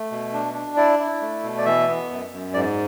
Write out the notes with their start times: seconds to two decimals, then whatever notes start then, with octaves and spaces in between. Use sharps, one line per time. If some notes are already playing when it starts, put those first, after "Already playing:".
Already playing: A3
0.11 B2
0.33 D4
0.54 D4
0.77 E4 D5
0.99 E4
1.21 A3
1.43 B2
1.58 D5
1.65 E3 E5
1.88 B3
2.10 F#2
2.32 F#2
2.54 G#2 D5